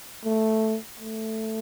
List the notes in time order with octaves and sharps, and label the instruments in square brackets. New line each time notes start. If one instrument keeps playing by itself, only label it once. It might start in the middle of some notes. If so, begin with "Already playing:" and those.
[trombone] A3
A3